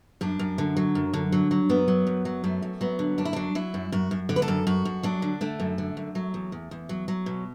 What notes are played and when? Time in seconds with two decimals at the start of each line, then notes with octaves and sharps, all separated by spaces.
0.21 F#2 D4
0.39 F#2
0.58 D3
0.77 F#3
0.95 F#2
1.13 D3
1.32 F#3
1.51 F#3
1.69 F#2 B3
1.88 F#3
2.07 F#2
2.25 F#3
2.44 F#2 A3
2.62 F#2
2.81 F#3 B3
2.99 D3
3.18 F#2 D4
3.25 E4
3.33 F#3 D4
3.55 F#3 E4
3.74 F#2
3.92 F#2 F#4
4.11 F#2
4.29 D3
4.36 B4
4.42 A4
4.48 F#2
4.67 F#2 F#4
4.85 F#2
5.03 F#3 D4
5.22 D3
5.41 D3 A3
5.60 F#2
5.78 D3
5.97 F#2
6.15 F#3
6.34 E2
6.52 E2
6.71 E2
6.89 F#3
7.08 F#3
7.26 B2